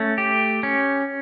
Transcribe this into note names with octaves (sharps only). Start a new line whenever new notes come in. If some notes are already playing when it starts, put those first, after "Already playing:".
Already playing: A3 C#4
G4
C#4